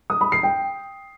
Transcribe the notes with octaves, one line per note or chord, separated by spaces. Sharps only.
D#6
B5
C7
G5